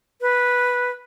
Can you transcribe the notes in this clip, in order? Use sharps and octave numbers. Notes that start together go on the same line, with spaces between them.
B4